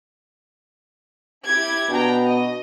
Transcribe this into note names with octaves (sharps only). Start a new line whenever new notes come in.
E4 G4 G#6
B2 D4 G5 A#5
D#5